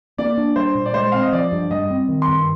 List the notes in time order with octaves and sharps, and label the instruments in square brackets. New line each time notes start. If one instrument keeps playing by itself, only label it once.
[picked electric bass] A#3 [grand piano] D5
[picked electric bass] D4
[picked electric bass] G3 [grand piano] C5
[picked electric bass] A#2
[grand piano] D5
[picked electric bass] G#3 [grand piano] C5
[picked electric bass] C4 [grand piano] F5
[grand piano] D#5
[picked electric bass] F3 [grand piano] D5
[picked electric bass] G2
[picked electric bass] G3 [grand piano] D#5
[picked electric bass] C4
D#3
[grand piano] C6
[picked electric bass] G2